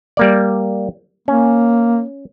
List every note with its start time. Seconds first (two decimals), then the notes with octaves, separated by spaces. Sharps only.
0.17 G3 A#3 D5
1.28 A#3 C#4